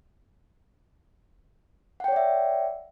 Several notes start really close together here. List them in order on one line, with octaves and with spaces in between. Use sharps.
F#5 G5 C#5 D5 E5